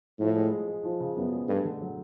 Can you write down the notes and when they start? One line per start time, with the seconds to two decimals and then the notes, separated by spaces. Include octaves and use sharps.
0.19 A2 F3
0.36 G#3
0.51 G#3
0.68 G#3
0.84 F3
1.00 C#3
1.16 F#2 B3
1.33 G#3
1.48 G2 A3
1.65 D3
1.81 F#3